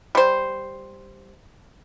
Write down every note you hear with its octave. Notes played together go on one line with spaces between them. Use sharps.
G3 C5